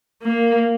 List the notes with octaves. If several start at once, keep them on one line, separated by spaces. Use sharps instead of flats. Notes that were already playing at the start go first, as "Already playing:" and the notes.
A#3